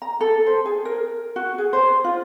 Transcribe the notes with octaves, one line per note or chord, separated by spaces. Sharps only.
A#5
A4
C5
G#4
A#4
F#4
G#4
C5
F4